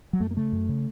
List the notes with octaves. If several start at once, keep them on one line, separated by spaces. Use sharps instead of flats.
F#3
F#2 A3
A#3
C#3 A3
F#2
C#3